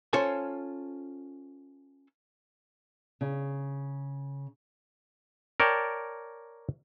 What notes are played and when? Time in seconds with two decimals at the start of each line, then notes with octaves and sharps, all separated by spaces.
0.13 C#4 F4 A4 C5 G#5
3.21 C#3
5.60 A#4 C#5 D5 G5 A5